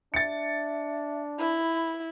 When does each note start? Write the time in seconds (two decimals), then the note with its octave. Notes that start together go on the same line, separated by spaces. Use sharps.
0.14 D4 E5 A6 C#7
1.39 E4 B5